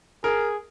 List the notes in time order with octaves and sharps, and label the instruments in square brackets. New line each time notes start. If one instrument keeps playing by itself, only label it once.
[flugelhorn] G#4 [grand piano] A#4